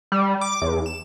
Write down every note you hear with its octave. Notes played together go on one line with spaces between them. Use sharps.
G3
D6
E2
E7